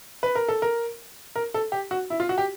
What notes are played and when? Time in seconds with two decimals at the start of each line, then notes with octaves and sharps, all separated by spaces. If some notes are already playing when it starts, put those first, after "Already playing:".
0.23 B4
0.35 A#4
0.48 A4
0.62 A#4
1.36 A#4
1.54 A4
1.72 G4
1.91 F#4
2.10 E4
2.20 F4
2.29 F#4
2.38 G4